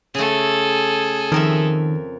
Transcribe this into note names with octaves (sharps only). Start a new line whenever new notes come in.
C#3 A3 G#4 A4
F2 D#3 A#4 E5